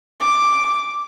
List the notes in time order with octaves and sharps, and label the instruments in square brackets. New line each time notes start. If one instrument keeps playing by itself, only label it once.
[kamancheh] D6